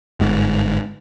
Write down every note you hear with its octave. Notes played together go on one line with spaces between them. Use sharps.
G1 G#2